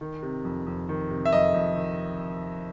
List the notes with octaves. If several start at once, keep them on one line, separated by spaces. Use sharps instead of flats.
D#3
C3
F2
F2
D#3
C3
E5
F2 D#5
F2
D#3